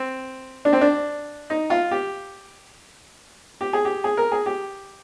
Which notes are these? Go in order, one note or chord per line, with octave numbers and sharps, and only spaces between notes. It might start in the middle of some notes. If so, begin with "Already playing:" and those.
Already playing: C4
D4
C4
D4
D#4
F4
G4
G4
G#4
G4
G#4
A#4
G#4
G4